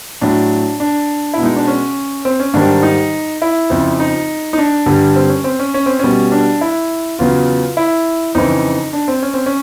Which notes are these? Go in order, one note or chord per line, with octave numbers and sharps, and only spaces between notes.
A2 F#3 D4
D4
B2 E4
G#3 D#4
D4
C#4
C4
C#4
G#2 D#3 G3 D4
D#4
E4
F2 C#3 F3
D#4
D#4
D4
G2 D3 G3
C4
C#4
C4
C#4
C#4
C4
B2 G3 C#4
D4
E4
E2 C#3 F#3 F4
E4
F2 C#3 E3 D#4
D4
C4
C#4
C4
C#4